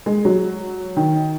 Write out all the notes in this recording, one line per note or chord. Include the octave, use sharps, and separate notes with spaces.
G#3
F#3
D#3